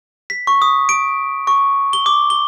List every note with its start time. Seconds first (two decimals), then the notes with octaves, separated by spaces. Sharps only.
0.30 B6
0.47 C#6
0.62 D#6
0.89 D7
1.47 C#6
1.93 G7
2.06 D6
2.30 G7